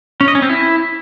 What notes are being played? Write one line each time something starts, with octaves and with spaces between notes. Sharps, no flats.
C#4
D#5
C#4
C4
E4